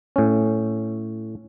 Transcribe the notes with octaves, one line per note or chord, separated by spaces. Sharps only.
A2 C#4